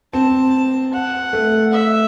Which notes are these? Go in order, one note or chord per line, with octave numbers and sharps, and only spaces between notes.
C4 A5
F#5
A3
E5